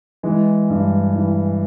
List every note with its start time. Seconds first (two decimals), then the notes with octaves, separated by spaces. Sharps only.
0.23 E3 G#3
0.70 G2
1.15 E3